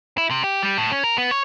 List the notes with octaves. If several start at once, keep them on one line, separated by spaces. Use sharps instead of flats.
E4
C3
G4
G3
A2
C#4
A#4
B3
C#5